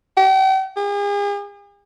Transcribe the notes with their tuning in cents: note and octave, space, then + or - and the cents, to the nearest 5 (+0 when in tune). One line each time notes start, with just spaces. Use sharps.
G5 -45
G#4 -40